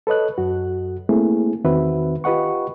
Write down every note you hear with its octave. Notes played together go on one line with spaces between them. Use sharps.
A4 B4 C#5 D#5 F#6
F#2 F#4
A3 A#3 C4 E4 G#4
E2 D#3 C4 F#4 B4 E5
F4 G4 B4 D#5 F#5 C#6